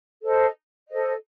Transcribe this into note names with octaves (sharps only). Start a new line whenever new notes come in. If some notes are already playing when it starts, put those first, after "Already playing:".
A4 C5 D#5
A4 C5 D#5